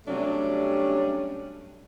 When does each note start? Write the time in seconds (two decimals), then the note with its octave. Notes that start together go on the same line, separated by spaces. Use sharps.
0.07 C3 F#3 G3 A3 C#4 D4